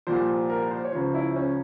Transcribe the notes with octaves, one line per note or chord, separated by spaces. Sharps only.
C2 A#2 F3 C5
A#4
C5
C#5
C#2 C#3 F3 C5
E4
C#4